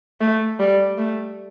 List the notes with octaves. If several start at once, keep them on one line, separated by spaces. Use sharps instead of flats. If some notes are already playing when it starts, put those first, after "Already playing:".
A3
G3
A3